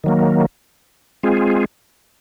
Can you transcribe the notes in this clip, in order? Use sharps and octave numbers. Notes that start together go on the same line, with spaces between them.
D#3 F#3 A#3
G#3 C4 F4 G#4